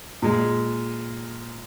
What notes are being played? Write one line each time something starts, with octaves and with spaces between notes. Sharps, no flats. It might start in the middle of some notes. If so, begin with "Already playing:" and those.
A#2 G#3